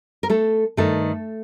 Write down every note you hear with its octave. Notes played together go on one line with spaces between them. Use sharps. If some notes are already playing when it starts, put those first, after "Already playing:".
A#4
A3 A4
G2 D#3 A3 A4